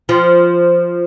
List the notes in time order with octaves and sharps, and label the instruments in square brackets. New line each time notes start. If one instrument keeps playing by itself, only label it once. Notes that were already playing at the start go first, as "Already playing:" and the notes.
[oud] F3